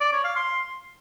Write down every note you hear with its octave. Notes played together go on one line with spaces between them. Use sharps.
D5
C#5
F5
C6